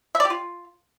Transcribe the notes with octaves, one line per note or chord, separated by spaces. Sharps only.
E5
D5
G4
F4